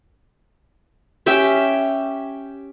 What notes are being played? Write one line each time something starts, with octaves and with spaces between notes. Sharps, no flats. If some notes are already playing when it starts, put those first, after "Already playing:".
C#4 G4 E5 G5